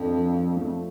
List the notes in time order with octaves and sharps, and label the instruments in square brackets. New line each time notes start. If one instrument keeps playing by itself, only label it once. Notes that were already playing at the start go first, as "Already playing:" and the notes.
Already playing: [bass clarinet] F2 [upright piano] F3 A3 D4
[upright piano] F3
F3
A3